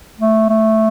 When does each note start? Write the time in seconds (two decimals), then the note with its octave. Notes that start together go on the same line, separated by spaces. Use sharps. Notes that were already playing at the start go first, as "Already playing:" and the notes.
0.20 A3
0.49 A3